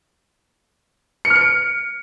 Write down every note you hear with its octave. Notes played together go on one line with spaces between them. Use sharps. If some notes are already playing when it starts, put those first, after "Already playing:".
C#7
F6
C#7
D7